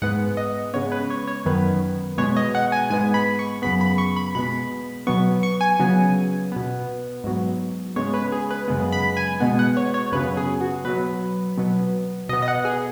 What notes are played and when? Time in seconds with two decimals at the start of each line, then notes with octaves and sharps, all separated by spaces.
0.02 G#2 G#3 B3 F#5
0.37 D#5
0.74 C#3 G#3 B3 C#5
0.92 B4
1.10 C#5
1.28 C#5
1.45 F#2 D#3 B3 B4
2.18 B2 G#3 B3 C#5
2.36 D#5
2.55 F#5
2.72 G#5
2.90 G#2 G#3 B3 G#5
3.14 B5
3.39 C#6
3.62 F#2 C#3 B3 B5
3.81 B5
3.98 C#6
4.16 B5
4.35 B2 G#3 B3 B5
5.07 B2 F#3 B3 C#6
5.43 C#6
5.61 G#5
5.79 C#3 F#3 B3
6.52 B2 B3
7.24 G#2 F#3 B3
7.96 C#3 G#3 B3 C#5
8.14 B4
8.32 G#4
8.50 B4
8.68 F#2 C#3 G#3 B3
8.92 B5
9.17 G#5
9.40 B2 G#3 B3
9.59 F#5
9.77 C#5
9.94 C#5
10.12 F#2 C#3 F#3 B3 B4
10.37 G#4
10.61 F#4
10.85 B2 F#3 B3 B4
11.57 B2 F#3 B3
12.29 B2 B3 D#5
12.42 D#5
12.48 F#5
12.65 G#4